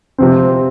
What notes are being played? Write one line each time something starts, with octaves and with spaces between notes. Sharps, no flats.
C3 F3 C4